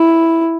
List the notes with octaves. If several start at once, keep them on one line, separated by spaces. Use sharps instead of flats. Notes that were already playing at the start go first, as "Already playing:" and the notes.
Already playing: E4